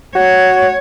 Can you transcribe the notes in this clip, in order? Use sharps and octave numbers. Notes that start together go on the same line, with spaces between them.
F#4 C#5